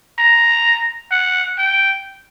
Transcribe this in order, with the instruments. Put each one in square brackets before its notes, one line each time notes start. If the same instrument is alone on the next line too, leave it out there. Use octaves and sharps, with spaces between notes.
[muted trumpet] A#5
F#5
G5